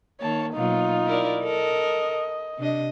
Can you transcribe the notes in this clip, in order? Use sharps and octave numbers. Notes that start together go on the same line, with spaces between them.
D#3 A#3 C#5 A5
B2 F#3 A#3 D#4 F4
E4 A#4 D5
A4 A#4 D#5
C3 D4 D#5